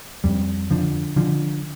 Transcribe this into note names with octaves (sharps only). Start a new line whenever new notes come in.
F2 G3
D3 F3
D3 F3